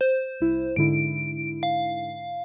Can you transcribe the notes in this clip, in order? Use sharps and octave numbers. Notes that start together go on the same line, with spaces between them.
C5
C2 E4
G#2 D3 E4 D7
F5